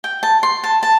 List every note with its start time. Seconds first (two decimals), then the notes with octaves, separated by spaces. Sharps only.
0.04 G5
0.23 A5
0.43 C6
0.64 A5
0.83 A5